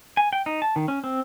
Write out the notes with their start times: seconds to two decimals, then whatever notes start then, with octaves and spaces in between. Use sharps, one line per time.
0.17 G#5
0.33 G5
0.46 D#4
0.62 A5
0.76 D#3
0.88 C#4
1.04 C4